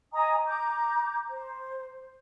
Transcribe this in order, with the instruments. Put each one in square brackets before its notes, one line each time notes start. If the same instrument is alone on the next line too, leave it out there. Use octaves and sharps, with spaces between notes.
[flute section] D#5 G#5 A#5 D#6
A#5 D6 G6
C5